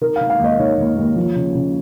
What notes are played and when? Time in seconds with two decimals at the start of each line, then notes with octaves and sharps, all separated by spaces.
0.01 D#3 A#4
0.16 D#3 F5
0.30 F5
0.39 D#2
0.44 D#5
0.59 D#3 C#5
0.78 D#2
0.96 D#2
1.16 F3
1.36 C#3
1.55 C#3